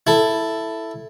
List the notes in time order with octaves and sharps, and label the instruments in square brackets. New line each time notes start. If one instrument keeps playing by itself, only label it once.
[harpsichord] E4 A4